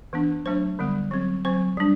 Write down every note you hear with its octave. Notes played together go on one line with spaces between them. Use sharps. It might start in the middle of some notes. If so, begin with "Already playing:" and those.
E3 B3 D4
F#3 A3 D4 C5
D3 G3 B3
F#3 C4
F#3 C4 C5
G3 D4